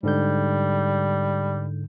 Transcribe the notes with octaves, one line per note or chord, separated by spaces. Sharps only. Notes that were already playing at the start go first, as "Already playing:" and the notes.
G#2 D3 G3 G6